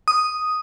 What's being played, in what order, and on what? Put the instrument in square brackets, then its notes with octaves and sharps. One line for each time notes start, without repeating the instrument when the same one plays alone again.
[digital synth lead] D#6